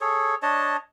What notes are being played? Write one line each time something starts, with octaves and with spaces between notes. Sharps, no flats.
G#4 A4 C#5
D4 C#5 D#5 A5